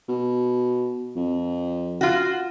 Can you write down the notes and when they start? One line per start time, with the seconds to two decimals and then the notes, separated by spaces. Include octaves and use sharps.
0.08 B2
1.16 F2
2.01 F4 F#4